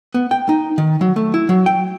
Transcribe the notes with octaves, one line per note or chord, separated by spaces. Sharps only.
B3
G5
D#4
D#3
F#3
A3
E4
F#3
G5